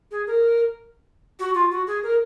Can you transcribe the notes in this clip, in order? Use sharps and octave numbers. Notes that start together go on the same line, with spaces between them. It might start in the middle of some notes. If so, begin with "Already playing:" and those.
G#4
A#4
F#4
F4
F#4
G#4
A#4